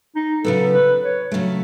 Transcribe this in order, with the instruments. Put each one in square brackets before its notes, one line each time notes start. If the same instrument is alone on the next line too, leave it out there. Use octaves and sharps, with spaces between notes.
[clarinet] D#4
[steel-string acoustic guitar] C#3 F#3 B3 [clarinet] A4
[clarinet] B4
C#5
[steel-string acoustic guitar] C#3 F#3 A3